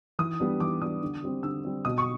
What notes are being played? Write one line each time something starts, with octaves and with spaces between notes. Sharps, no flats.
E3 D#6
G3 B3 D4
E3 D6
G3 B3 D4 D#6
D3
G3 C4
D3 E6
G3 C4
B2 D#6
C#6